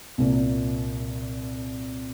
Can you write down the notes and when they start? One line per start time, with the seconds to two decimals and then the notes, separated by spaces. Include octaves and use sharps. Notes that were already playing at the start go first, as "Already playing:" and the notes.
0.18 C2 A#2 A#3